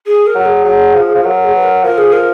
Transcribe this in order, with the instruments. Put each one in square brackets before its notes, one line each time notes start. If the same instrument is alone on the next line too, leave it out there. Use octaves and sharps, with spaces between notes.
[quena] G#4
A#4
[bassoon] F#3
[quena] G#4
[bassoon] F#3
F3
F3
[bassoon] F#3 [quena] A#4
[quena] G#4
B4
A#4
[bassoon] F3 [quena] A#4
[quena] G#4
A#4